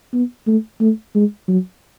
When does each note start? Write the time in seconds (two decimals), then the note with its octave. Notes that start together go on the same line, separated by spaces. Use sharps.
0.13 B3
0.47 A3
0.81 A3
1.15 G#3
1.48 F#3